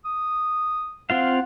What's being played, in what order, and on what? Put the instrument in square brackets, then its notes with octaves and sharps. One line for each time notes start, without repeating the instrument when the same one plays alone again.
[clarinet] D#6
[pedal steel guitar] C4 F4 F5 [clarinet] F#5